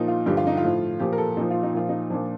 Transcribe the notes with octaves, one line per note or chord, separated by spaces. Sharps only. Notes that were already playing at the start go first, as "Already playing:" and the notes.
Already playing: A#2 F3 D#4
F4
G2 D3 F3 G4
F4
D#4
F4
A2 F3
A#2 F3 G4
A#4
A4
A#2 F3 D#4
F4
D#4
A#2 F3 F4
D#4
A#2 F3 D4